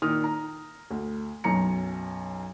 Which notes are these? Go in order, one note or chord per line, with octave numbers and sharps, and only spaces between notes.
A#2 D#3 D#6 F6
A#5
D2
B1 F#2 A#5 C#7